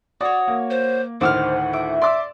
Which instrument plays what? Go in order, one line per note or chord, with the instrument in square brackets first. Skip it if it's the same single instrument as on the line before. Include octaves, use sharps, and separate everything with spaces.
[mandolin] F#4 C#5 [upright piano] D5 [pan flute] D#6
[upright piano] A#3
[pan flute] C5
[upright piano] D2 A2 D#3 [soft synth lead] C5 [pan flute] F#5 [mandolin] D6 E6 F6
[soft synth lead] E5 [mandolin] D6
[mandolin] D5 [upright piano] C6 D6 E6